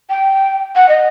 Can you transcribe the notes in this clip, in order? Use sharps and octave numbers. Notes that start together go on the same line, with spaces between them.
G5
F#5
D#5